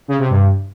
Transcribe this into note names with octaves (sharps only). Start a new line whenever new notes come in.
C#3
C3
G2